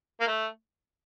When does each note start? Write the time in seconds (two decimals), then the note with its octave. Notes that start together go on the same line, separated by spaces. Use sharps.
0.20 A#3
0.27 A3